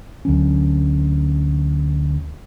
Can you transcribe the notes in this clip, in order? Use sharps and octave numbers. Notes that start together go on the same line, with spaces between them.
D2 F#3 C#4